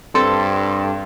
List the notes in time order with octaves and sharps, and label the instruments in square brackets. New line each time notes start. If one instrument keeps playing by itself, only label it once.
[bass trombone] G2 [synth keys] C4 A4 [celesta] C6